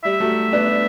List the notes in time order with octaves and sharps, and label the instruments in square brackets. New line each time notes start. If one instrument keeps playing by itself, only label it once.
[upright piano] G3 [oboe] E5
[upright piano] F#3 A3
B3 D4